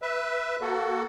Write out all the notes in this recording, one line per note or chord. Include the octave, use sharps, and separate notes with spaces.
B4 E5
A#3 F#4 A4